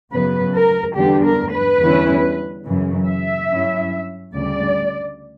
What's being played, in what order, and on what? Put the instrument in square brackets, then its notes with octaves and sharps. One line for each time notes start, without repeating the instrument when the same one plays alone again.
[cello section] F#2 C#3 F#3 B3 B4
A#4
E2 D3 G3 B3 D4 G4
A#4
B4
E2 D3 G3 C#4 E4
F#2 C#3 E3
E5
G2 F#3 C#4 E4
D2 C#3 G3 D5